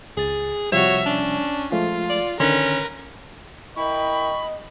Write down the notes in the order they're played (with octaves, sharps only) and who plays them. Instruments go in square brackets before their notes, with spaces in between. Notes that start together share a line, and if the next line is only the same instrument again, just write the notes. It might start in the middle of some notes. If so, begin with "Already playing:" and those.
[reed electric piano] C#2 A6 [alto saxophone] G#4
[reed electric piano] C3 F3 G3 [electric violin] F#4 E5 [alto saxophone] C#5
[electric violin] C#4 [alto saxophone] D4
[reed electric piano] F3 G#3 A3 [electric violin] F4
[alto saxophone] D5
[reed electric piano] D3 D#3 C6 [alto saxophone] C#4 [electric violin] A#4 B4
[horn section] E4 A#4 G5 [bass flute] D#5 [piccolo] B5 [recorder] C#6